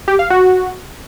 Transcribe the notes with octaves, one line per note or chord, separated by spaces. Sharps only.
G4
F5
F#4